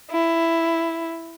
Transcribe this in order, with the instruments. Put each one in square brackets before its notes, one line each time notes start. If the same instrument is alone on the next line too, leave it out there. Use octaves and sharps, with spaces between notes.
[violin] E4